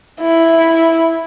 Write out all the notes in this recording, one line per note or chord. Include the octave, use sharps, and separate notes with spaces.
E4